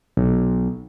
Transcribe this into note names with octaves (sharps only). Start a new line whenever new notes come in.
B1